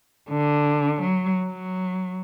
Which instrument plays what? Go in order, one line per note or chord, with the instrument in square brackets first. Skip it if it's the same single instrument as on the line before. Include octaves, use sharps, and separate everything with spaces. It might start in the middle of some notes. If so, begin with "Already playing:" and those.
[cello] D3
F#3
F#3